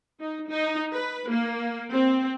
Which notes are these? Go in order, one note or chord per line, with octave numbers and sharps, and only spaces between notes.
D#4
D#4
B4
A#3
C4